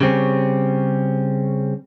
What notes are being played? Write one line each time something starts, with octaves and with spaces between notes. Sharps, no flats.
C#3 G3 C4 C#4